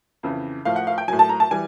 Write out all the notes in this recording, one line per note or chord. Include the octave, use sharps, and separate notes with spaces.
F2 C#3 E3
A2 F3 F5
F#5
F5
G5
A2 F#3 G#5
A5
A#5
A5
E3 G3 G#5